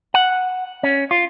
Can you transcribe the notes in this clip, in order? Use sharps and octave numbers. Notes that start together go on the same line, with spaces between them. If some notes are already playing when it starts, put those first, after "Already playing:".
F#5
C#4
F4